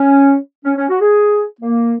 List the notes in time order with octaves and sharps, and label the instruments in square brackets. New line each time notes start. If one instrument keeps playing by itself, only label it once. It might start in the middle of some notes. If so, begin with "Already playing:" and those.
Already playing: [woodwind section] C#4
C#4
C#4
F#4
G#4
A#3